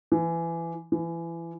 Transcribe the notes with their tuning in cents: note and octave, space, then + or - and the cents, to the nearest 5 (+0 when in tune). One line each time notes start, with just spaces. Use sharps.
E3 +20
E3 +25